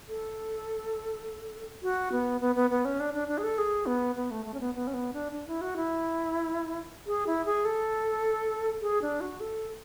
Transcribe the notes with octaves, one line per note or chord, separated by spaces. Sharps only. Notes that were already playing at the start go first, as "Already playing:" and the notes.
A4
F#4
B3
B3
B3
B3
C#4
D4
D4
D4
G#4
A4
G#4
B3
B3
A3
A3
C#4
B3
B3
C#4
B3
D4
D4
E4
F#4
E4
G#4
E4
G#4
A4
G#4
D4
F#4
A4